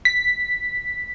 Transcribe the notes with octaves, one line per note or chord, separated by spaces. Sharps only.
B6